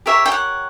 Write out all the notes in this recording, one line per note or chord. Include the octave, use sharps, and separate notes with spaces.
G4 A#4 C#5 E5
G5
F#5